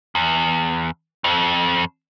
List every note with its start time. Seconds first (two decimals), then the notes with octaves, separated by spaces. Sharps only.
0.15 E2
1.24 F2 C4